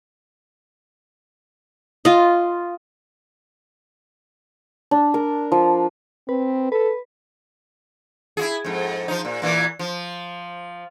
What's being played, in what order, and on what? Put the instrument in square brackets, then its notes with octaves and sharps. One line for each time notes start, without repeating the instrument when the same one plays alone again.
[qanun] F4 D#5
[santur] D4
A#4
F3
[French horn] C4 [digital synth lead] B4
[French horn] A4 [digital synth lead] B4
[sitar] E4 F#4 G#4
F2 G#2
F3 D#4
A#2
A#2 E3 A#3
F3